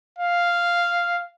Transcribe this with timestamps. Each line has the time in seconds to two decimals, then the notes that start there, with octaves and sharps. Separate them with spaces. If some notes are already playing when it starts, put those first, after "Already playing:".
0.18 F5